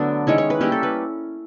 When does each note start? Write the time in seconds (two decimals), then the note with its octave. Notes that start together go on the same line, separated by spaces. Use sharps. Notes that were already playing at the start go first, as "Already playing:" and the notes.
Already playing: D3 F#3 A3 B3 D4
0.27 D#3 G#3 C#4 E4 C#5
0.38 C#5
0.50 B4
0.61 G3 A#3 C#4 E4 G4
0.72 A4
0.83 B4